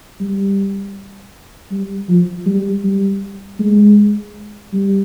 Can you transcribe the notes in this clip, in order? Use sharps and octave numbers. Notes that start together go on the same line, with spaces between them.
G3
G3
F3
G3
G3
G#3
G3